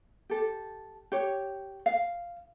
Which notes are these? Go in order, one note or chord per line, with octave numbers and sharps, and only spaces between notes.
G4 A4
G4 C#5
F5